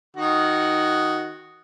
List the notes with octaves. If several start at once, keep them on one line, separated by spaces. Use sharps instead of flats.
D#3 F#4